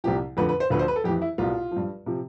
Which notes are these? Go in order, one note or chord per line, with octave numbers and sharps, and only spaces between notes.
C2 C3 F3 G4
F2 D3 F3 B4
B4
C5
D2 D3 F3 B4
C5
B4
A4
F2 E3 G4
E4
C2 B2 F4
F3
G2
C3 F3